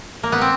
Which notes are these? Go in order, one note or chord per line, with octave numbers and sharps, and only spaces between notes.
A#3
B3
C4